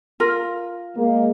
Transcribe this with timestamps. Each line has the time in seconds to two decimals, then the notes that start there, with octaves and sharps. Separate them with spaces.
0.20 F4 A#4
0.97 G#3 A#3